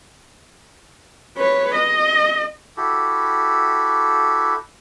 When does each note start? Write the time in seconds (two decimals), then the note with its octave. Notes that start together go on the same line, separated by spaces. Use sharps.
1.37 B4 C#5
1.75 D#5
2.77 E4 F#4 G4 A4